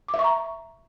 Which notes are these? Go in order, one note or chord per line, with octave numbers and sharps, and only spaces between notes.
D6
E5
C#6
A#5